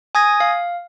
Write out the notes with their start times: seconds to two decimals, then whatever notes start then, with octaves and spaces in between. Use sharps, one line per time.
0.15 G#5 D#6 G#6 A#6
0.40 F5